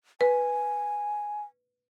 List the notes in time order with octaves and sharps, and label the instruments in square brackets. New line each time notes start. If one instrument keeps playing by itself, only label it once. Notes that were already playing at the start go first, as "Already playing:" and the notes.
[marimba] B4 [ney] G#5